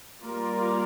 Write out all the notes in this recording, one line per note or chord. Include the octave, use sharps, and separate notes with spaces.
G3 A#3 F4 A#4 D5